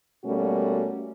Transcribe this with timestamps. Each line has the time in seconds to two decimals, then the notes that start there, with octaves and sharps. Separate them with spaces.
0.25 B2 G3 A3 A#3 C#4 F#4